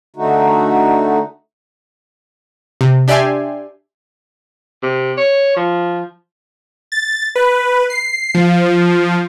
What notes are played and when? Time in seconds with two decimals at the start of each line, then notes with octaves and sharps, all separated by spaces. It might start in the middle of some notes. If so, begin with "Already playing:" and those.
0.16 D3 A3 D#4 F#4
2.81 C3
3.08 D4 G4 D5 E5 G#5 C6
4.83 C3
5.17 C#5
5.57 F3
6.92 A6
7.35 B4
7.90 C7
8.34 F3